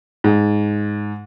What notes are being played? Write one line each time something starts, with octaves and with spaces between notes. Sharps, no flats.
G#2